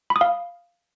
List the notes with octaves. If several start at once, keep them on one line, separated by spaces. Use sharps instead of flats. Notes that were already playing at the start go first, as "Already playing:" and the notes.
B5
D#6
F5